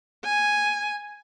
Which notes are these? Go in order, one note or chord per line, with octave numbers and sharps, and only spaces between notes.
G#5